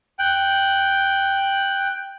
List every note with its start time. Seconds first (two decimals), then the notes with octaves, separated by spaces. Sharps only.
0.19 G5 F#6